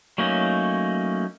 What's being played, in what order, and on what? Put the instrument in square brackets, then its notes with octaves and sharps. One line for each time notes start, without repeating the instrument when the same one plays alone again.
[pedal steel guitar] F#3 A3 A#3 C#4 D#4